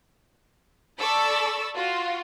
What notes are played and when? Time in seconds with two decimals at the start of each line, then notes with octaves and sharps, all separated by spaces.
0.98 A4 D5 B5 C#6 E6
1.74 F4 F#4